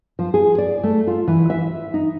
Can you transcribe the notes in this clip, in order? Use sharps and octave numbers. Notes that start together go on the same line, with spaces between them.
F3
G#4
D5
A3
F4
E3
E5
D#4